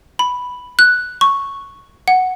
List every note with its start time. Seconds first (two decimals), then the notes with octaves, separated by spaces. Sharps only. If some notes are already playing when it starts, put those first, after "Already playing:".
0.19 B5
0.79 F#6
1.21 C#6
2.08 F#5